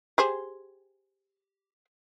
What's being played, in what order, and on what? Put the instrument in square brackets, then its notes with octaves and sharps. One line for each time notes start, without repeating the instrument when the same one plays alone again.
[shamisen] G4 G#4 C5